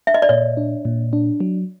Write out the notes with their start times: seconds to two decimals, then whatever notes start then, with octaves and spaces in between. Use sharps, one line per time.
0.07 E5
0.14 D#5
0.22 D5
0.29 A#2 C#5
0.57 D4
0.85 A#2
1.13 D4
1.40 F#3